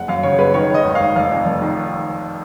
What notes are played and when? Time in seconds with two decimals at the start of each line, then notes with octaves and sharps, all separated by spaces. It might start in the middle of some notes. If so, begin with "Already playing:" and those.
Already playing: F#1 F#5
0.08 F#2 F5
0.23 C#3 C#5
0.39 F#1 B4
0.54 D#3 C#5
0.69 D#3
0.74 D#5
0.84 G#1
0.95 G#1 F5
1.16 F1 F5
1.31 F2
1.46 F1
1.62 D#3